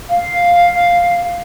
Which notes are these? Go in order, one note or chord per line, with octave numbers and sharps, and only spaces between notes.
F5